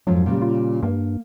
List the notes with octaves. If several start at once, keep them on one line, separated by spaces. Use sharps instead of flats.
F2 G#2 F#3 F4
A#2 C#3 G3
F4
G2 A#3